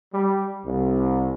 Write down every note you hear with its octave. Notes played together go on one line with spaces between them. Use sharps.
G3
C2